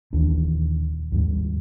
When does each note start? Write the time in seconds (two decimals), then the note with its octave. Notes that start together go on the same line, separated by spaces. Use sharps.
0.13 D#1 D#2 E3 D4
1.12 D#2 G#2 G3